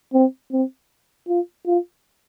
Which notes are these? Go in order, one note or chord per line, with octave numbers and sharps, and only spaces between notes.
C4
C4
F4
F4